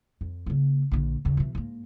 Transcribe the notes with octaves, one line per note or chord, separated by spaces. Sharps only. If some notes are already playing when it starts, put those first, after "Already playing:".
F2
C#3 A#3
A#1 D3
D#2 C#3
B2 E3
G#2 A#3